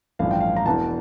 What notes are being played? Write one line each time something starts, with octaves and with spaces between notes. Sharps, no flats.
A1 G2 F3 F5
G5
F5
A#5
E1 E2 E3 A5